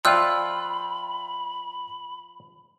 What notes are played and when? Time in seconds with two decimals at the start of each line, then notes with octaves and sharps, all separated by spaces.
0.05 F3 F4 D5 E5 G5 B5 E6 F#6